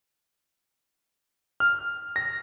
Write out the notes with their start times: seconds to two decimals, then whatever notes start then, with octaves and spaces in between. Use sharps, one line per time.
1.60 F6
2.16 A#6